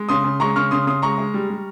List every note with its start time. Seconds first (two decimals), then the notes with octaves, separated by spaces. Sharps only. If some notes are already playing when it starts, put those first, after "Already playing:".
Already playing: G#3
0.09 C#3 C6 D#6
0.24 C#3
0.40 G#3 A#5 C#6
0.56 C#3 C#6 F6
0.71 C#3 C6 D#6
0.87 C#3 C6 D#6
1.02 G#3 A#5 C#6
1.18 G#3
1.34 G3
1.50 G3